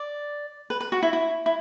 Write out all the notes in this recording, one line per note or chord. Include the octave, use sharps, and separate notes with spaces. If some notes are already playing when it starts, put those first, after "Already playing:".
Already playing: D5
B4
B4
F#4
E4
E4
E4